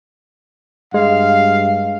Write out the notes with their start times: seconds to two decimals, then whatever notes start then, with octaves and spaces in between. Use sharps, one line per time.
0.94 G2 G#3 F5